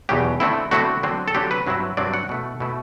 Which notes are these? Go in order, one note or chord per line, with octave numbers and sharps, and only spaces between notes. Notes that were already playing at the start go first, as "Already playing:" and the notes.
E2 B2 F#3 G4
D3 A3 C4 E4
D3 A3 C4 E4 F#4
D3 F#3 C4
A4
D3 F#3 C4 G4
B4
G2 F#3 C4 E4
G2 F#3 C4 E4 D5
F#5
B2 A3 E4
B2 A3 E4